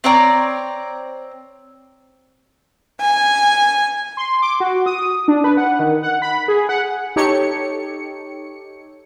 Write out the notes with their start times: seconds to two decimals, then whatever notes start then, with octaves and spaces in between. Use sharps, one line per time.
0.04 C4 C#5 D5 A#5
3.00 G#5
4.17 C6
4.42 D6
4.60 F#4
4.86 D#6
5.28 D4
5.44 B4
5.57 F#5
5.79 D#3
6.03 F#5
6.22 B5
6.48 G#4
6.69 F#5
7.16 D#4 G4 A4 C#5 C#7